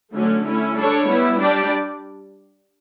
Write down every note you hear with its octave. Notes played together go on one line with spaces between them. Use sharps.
D3 F#3 A3 C#4
A3 C#4 E4
G3 D4 A4 C#5
G3 B3 E4
G3 D4 G4 D5